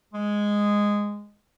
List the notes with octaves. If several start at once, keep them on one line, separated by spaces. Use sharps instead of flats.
G#3